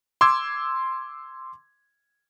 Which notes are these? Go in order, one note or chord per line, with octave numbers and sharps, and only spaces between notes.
C6 D6 E6 G#6